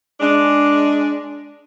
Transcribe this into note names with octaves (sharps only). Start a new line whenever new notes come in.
G#3 D4